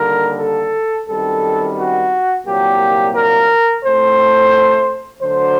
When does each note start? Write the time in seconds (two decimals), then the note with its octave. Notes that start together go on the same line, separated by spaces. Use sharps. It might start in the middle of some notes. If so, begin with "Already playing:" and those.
Already playing: D#2 D3 G3 A#3 A#4
0.39 A4
1.08 F#2 D#3 G3 C4 A4
1.77 F#4
2.46 C2 A#2 F#3 A#3 G4
3.15 A#4
3.83 A2 A3 C4 C5
5.21 D2 D3 F#3 C5